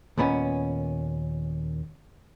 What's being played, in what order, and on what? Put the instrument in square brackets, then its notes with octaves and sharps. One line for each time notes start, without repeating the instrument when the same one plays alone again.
[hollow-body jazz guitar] D#2 A#2 B3 C#4